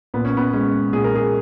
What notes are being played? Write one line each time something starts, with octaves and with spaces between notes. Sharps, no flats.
A#2 B3
C#4
B3
G#3 C#4
A#2 G#4
A#4
G#4